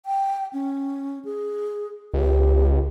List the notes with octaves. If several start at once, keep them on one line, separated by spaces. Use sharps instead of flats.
G5
C#4
G#4
C#2 G4